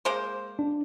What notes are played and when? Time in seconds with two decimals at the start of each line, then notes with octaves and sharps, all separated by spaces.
0.05 G#3 A#3 C5
0.59 D4